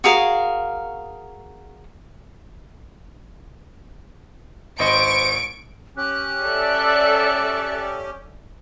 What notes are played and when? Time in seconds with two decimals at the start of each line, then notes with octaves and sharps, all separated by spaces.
0.04 F#4 G#4 A#4 F5
4.79 G#1 B4 C5 D#5 C#6 D7
5.97 C#4 G4 F#6
6.43 A4 D5 E5